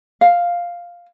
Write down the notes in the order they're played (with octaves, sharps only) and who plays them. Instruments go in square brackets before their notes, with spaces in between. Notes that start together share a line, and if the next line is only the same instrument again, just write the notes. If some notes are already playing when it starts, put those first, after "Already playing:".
[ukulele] F5